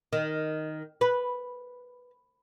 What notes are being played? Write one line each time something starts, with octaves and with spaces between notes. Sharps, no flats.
D#3
B4